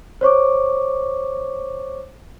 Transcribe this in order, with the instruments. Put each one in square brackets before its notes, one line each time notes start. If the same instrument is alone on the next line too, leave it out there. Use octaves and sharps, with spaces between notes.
[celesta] C5 C#5 C#6 D6